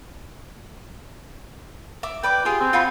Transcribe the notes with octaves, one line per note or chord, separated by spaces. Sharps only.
E5 D6
B4 D5 G5 D6
F4 G4 G#4
C4
F4 F#4 B5